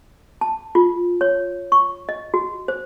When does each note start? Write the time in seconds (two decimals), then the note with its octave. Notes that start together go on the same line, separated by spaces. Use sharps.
0.41 A5
0.75 F4
1.21 C#5
1.72 C#6
2.09 D#5
2.34 F#4
2.68 C5